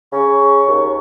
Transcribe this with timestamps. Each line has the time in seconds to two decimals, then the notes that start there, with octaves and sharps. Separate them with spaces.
0.13 C#3 C#6
0.68 D#2